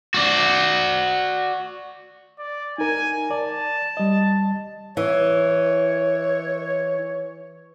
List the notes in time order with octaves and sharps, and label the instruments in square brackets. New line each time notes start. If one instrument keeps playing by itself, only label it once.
[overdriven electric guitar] F#4 D5
[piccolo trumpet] D5
[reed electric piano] D#4 A#4 [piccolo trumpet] G#5
[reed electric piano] D5 [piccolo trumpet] A5
[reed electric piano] G3 D#5
[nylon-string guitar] E3 [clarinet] C#5